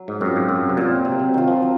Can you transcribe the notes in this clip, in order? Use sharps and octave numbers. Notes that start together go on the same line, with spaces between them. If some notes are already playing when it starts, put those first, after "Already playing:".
Already playing: F#3
G#2
F#2 C4 F4
G#2
F#2 F#3
C3
A#2 C4 F4
C3 F#3
C3
D#3 C4 F4
F3
F#3